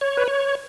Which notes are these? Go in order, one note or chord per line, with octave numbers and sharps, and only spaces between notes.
C#5
B4
C#5